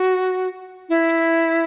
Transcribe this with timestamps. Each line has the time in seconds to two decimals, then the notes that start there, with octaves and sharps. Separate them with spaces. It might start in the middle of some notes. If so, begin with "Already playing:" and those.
Already playing: F#4
0.89 E4